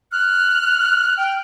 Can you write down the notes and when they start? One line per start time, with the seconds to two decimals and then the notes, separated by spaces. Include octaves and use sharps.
0.12 F6 F#6
1.17 G5